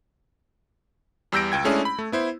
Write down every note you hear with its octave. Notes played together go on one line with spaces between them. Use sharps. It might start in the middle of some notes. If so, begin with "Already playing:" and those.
E2 G3 E6 G6 A#6 D7
C#2 G5 G#6
G#3 A3 C#4 D4 E4 G#4
B5
A3
B3 E4 C5